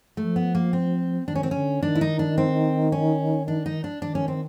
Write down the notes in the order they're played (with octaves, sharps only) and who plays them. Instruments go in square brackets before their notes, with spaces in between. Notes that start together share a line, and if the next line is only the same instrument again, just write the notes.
[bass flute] F3 [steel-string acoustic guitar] A3
[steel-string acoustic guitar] B3
A#3
C4
[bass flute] D#3 [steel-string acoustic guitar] D4
[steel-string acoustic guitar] C#4
C4
[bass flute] D3 [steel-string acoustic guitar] C#4
[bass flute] D#3 [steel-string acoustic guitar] D4
[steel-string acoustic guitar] E4
D#4
D4
C4
C#4
D4
D#4
D4
[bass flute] D#3 [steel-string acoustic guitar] D4
[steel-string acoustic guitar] C#4
C4